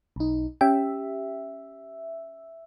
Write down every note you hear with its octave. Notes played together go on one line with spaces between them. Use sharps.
B1 D#4
C#4 G4 E5 G5